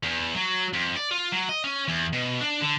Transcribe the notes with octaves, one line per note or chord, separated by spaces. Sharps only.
E2
F#3
F2
D5
F4
F#3
D#5
C#4
E2
B2
D4
D3